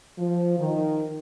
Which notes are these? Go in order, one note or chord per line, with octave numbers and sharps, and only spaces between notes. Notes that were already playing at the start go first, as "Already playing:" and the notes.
F3
D#3